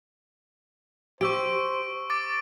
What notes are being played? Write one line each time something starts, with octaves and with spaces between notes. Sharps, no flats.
G4 C5 C#6 E6 D7
D6 A6 D7